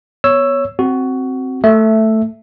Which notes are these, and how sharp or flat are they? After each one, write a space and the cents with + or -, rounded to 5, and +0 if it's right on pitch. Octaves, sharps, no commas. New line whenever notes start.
B3 +0 C#5 +0 E6 +10
C4 +0 F#4 +10
A3 +5 E5 +0